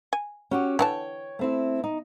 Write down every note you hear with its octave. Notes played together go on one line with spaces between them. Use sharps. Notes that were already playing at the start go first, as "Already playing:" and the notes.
G#5
C#4 F#4 G4
D3 E3 C#5 G5 A5
A3 C4 E4
D#4